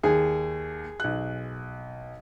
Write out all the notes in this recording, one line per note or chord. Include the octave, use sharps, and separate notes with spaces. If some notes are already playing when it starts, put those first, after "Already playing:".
D#2 G#4
B1 F#6